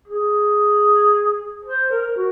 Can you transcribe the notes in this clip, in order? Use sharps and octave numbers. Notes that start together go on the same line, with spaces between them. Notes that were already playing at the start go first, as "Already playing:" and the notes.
G#4
C5
A#4
F#4